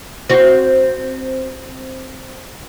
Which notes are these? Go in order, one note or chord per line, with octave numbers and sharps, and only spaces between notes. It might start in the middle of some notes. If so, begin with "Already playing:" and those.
C4 F#4